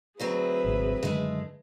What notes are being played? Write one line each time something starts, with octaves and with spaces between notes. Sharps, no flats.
D2 F#3 C4 G#4 B4 E5
G#1 C#2
F#2 D3 D#3 G#3 A3